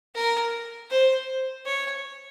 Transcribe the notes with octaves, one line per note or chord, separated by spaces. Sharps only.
A#4
C5
C#5